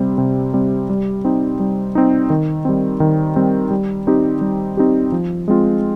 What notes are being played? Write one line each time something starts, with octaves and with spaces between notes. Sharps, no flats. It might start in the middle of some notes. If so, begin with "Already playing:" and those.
Already playing: C3 G3 C4
C3
G3 C4
G3
C4 D#4
G3
C4 D#4
D#3
G3 C4
D#3
G3 C4
G3
C4 D#4 G4
G3
C4 D#4 G4
F3
G#3 C4 F4